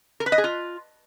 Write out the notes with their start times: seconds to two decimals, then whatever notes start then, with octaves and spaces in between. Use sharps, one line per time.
0.20 A#4
0.26 B4
0.32 D#5
0.38 G#4
0.44 F4